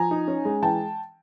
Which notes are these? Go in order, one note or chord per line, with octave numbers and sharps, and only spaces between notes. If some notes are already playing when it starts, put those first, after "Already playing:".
Already playing: F3 G#5 A#5
D#4
C#4
G#3
E3 G5 A5